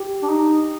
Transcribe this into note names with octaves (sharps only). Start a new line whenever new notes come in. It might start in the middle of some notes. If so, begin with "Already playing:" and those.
Already playing: G4
D4
D#4